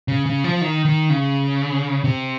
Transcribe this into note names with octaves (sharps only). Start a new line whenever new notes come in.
C#3
C#3
F3
D#3
D#3
C#3
C3